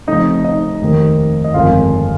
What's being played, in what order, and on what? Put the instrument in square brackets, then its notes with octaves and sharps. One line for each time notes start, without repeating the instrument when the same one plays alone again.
[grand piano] F1 F2 C#3 D#4 D#5
D#4 D#5
F1 D#2 D#3
D#5
G1 F2 D#3 G#3 C#4 F4 F5